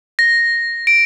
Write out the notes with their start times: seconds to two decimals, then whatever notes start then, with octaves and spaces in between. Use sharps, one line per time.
0.19 A#6
0.87 D7